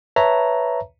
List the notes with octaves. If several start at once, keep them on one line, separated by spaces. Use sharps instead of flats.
B4 C#5 E5 A5 A#5